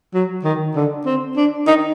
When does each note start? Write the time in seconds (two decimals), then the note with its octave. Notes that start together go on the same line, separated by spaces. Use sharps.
0.14 F#3
0.44 D#3
0.76 D3
1.06 C4
1.36 D4
1.67 D#4